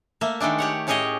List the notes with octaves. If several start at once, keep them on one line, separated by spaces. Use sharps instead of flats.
A3 A#3 E5
D#3 G#3 A3 D4
G4 C#5 F#5
A2 C#4 G4 G#4 C#5 D#5